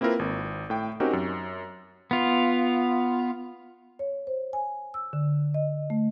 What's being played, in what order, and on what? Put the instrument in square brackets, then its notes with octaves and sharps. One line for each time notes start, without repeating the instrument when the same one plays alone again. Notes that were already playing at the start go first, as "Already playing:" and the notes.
[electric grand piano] A#3 C4 E4 F4 A#4 B4
G#1
A2 G5
C4 C#4 D#4 F#4 G4 A#4
F#2
[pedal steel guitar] B3 F4
[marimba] C#5
C5
G#5
E6
D3
D#5
A3